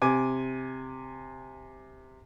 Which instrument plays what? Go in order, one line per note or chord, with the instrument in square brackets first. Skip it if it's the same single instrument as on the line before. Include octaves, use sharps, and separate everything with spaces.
[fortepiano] C3 G#5 D6